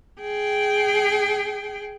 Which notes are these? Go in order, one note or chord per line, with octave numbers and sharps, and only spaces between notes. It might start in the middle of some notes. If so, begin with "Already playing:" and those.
G#4 G5